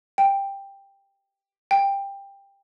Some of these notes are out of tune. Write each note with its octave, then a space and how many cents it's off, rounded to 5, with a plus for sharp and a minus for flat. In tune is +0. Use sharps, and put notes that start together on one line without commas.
G5 +10
G5 +15